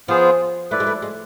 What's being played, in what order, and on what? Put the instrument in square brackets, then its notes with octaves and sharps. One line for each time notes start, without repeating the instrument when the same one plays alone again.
[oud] F3 [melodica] B3 F4 G#4 C5
[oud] A3 [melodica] E4 B4 D5
[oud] G#3
A3
G#3